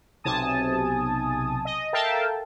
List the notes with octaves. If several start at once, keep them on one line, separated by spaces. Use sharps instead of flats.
B1 C3 G#5 A5 D#6
D#5
A4 A#4 E5 F5 G5 A5